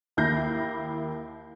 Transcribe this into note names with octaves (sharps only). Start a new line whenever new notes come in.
D#2 A#3 E4 G6 A#6 C7